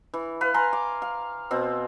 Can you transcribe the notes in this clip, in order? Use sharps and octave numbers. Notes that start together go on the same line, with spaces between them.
E3
B4 F5
F5 G#5 A#5 C6
D6
F5
B2 C4